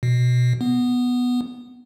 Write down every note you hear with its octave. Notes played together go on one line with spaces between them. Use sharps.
B2
B3